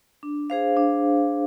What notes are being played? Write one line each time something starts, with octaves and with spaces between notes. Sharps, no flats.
D4
G#4 C5 F5
D4